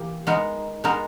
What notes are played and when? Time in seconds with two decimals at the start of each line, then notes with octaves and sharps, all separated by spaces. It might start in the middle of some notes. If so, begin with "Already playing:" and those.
Already playing: E3 A#3 G4
0.27 G#3 B3 D#4 A#4
0.84 G#3 B3 D#4 A#4